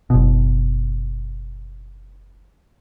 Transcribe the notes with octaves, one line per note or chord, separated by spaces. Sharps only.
F#1 B2